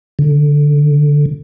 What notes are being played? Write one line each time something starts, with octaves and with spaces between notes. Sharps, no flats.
D3